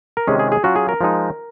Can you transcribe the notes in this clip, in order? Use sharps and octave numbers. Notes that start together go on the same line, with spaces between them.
A#4
C3 D#3 G#3 C#4 G#4
G#4
G#4
F#3 C#4 F4 F#4
G#4
A#4
F3 G#3 D#4